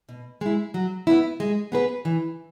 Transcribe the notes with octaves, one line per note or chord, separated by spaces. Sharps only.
B2
G#3 E4
F#3
B3 E4
G#3
B3 G#4 B4
E3